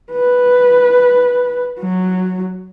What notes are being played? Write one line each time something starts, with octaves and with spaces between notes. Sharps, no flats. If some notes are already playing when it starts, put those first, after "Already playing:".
B4
F#3